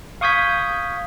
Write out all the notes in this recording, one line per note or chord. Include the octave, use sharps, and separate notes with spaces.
F5 C#6 D#6 G6 G#6 B6